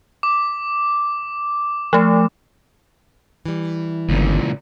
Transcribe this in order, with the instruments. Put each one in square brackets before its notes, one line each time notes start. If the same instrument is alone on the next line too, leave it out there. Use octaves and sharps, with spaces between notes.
[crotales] D6
[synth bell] F3 A3
[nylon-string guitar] E3 G3
[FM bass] G1 [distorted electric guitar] C#2 A#2